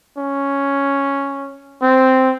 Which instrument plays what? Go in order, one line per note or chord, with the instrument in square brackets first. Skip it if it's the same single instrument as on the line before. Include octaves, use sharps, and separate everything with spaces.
[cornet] C#4
C4